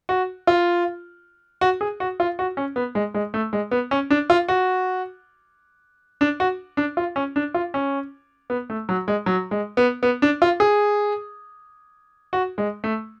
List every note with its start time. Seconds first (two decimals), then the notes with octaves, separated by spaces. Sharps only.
0.09 F#4
0.47 F4
1.61 F#4
1.81 G#4
2.00 F#4
2.20 F4
2.39 F#4
2.57 C#4
2.76 B3
2.95 G#3
3.14 G#3
3.34 A3
3.53 G#3
3.71 B3
3.91 C#4
4.11 D4
4.30 F4
4.49 F#4
6.21 D4
6.40 F#4
6.77 D4
6.97 F4
7.16 C#4
7.36 D4
7.54 F4
7.74 C#4
8.50 B3
8.70 A3
8.89 F#3
9.08 G#3
9.26 F#3
9.51 G#3
9.77 B3
10.03 B3
10.22 D4
10.42 F4
10.60 G#4
12.33 F#4
12.58 G#3
12.84 A3